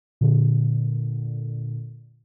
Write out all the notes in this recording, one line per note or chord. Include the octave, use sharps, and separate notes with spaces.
A#2 D3